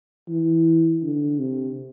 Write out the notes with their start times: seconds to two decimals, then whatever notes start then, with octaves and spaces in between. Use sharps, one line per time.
0.29 E3
1.03 D3
1.39 C3